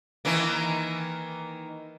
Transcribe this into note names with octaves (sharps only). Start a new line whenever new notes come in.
D#3 E3 A#3